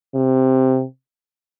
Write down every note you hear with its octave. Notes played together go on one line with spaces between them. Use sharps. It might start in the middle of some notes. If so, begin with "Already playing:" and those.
C3